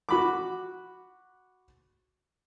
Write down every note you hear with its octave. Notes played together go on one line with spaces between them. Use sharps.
F#4 B5 D6